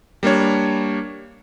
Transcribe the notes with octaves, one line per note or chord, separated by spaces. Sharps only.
G3 A#3 D4 C#5